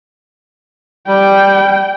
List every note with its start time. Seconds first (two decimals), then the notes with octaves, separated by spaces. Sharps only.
1.08 G3 G5